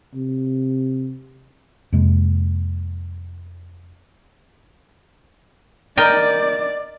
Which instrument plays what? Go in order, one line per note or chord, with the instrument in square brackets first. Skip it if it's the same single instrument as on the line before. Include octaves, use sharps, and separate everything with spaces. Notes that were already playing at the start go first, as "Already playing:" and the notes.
[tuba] C3
[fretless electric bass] F2 C3 G#3 A#3
[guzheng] A#4 D#5 G5 [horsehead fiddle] D5